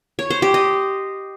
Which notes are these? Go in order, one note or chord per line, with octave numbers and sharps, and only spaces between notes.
C#5
C5
G4
D#5